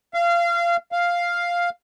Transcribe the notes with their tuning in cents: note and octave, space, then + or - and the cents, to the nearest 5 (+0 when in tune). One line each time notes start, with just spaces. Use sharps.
F5 -25
F5 +0